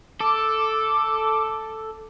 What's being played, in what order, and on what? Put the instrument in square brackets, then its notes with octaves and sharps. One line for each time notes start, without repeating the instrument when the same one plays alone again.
[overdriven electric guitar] A4 [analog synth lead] D6